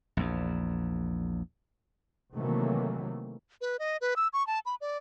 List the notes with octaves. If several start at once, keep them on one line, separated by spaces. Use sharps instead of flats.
A#1 E2
C3 D#3 E3 F#3 A3 A#3
B4
D#5
B4
E6
C#6
A5
B5
D5